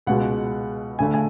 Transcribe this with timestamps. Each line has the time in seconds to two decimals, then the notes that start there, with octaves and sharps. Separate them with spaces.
0.07 C#2 B2 G#3 F#5
0.99 D2 D3 A3 G#5
1.14 G#5